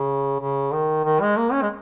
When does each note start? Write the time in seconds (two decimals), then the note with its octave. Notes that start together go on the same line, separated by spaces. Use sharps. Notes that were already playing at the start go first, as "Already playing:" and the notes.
Already playing: C#3
0.40 C#3
0.72 D#3
1.05 D#3
1.21 G#3
1.37 A#3
1.52 C#4
1.62 G#3